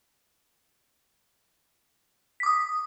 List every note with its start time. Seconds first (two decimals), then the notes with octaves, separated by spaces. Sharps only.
2.40 B6
2.43 D6
2.46 D#6